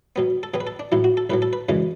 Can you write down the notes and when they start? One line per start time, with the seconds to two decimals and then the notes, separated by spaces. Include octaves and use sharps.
0.16 B2 F#3 B3
0.43 A4
0.54 B2 F#3 B3 G#4
0.60 B4
0.67 A4
0.79 D4
0.92 B1 A2 F#3 E4
1.04 F#4
1.17 A4
1.30 B1 A2 F#3 B4
1.42 A4
1.53 B4
1.69 F#2 C#3 E3 G#3